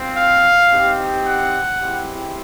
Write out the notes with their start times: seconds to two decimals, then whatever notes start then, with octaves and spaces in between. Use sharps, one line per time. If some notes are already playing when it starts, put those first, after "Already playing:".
Already playing: C4 F4
0.16 F5
0.71 C4 D#4 G4
1.25 F#5
1.79 G#3 C4 E4 G4